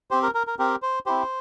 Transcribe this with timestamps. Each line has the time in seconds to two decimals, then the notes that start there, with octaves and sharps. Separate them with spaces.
0.11 C4 G4 C5
0.23 A#4
0.35 A#4
0.47 A#4
0.59 C4 G4 A#4
0.82 C5
1.06 C4 E4 G4 C5